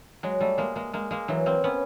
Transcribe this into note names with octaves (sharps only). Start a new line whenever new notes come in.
F#3 G#3
G3 A3
G#3 A#3
G#3 A#3
G#3 A#3
G#3 A#3
E3 F#3
A#3 C4
B3 C#4